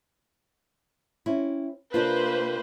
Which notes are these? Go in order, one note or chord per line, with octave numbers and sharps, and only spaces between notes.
C4 C#4 E4
C3 A#3 D4 F4 B4 C5